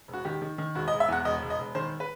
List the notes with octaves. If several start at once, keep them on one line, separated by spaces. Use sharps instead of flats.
E1
F#4
D#3 G4
D#3
D#3
E1 F#4
D#5
E1
E5
E2 F#5
E1 D#5
E1
D#5
E1
D#3 C5
B4